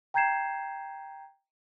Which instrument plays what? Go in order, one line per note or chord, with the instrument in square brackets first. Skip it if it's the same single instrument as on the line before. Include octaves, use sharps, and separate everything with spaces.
[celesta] G5 A#5 G6 G#6 C7 E7